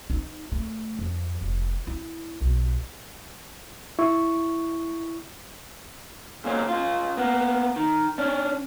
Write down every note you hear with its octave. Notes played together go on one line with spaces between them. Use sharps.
D#4
A3
F2
F1
E4
B1
E4 C#6
B1 A#2 A#3 C#4
C#3 F4
A#3 B3
D#3
C#4 D4